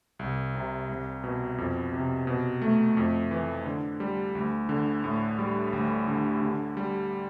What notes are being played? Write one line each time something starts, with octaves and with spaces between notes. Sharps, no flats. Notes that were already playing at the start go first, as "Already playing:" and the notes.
C2
C3
C2
B2
F2
C3
B2
A3
F2
E3
D3
G3
D2
D3
A2
G3
D2
D3
D3
G3